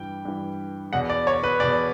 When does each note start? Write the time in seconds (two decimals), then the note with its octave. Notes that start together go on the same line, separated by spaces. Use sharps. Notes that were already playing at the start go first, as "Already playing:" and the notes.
Already playing: G2 E3 G5
0.25 G2 E3
0.93 E2 B2 F#5
1.10 D5
1.27 C#5
1.43 B4
1.60 E2 B2 D5